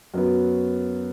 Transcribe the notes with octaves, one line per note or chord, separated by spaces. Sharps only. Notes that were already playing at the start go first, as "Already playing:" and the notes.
F#2 F#3 B3